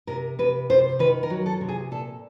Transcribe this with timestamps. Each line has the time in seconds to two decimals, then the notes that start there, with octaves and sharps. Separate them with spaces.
0.07 C3 A#4
0.39 C3 B4
0.70 C3 C5
0.99 D#3 B4
1.23 A#4
1.30 F#3
1.46 A4
1.61 C3
1.68 G#4
1.91 A#2 A4